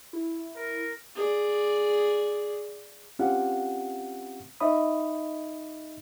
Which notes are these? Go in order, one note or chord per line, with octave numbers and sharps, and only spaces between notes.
E4
A#4
G#4 D5
C4 C#4 F4 G4 F5 F#5
D#4 C#5 D#5 E5 B5 D#6